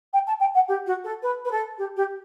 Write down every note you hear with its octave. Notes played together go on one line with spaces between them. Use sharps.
G5
A5
G5
F#5
G4
F#4
A4
B4
B4
A4
G4
G4